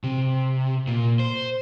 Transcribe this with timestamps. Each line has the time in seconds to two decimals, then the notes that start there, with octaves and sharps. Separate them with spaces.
0.04 C3
0.87 A#2
1.19 C5